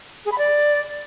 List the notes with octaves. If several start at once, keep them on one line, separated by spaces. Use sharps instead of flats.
G#4
B5
D5